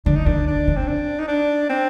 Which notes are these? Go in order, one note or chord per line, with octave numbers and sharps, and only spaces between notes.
D3 D4
D#4
D#3 D4
D3 D4
D#3
C4
D4
D#4
D4
C4